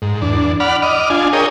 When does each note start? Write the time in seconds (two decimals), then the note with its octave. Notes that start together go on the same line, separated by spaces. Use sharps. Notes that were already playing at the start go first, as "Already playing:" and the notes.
0.02 G#2
0.22 E2 D4
0.60 D5 F#5 B5 F6
0.82 D#5 D6 F6
1.10 D4 F4 G#5
1.33 G#4 A#4 C#5 G5 D#6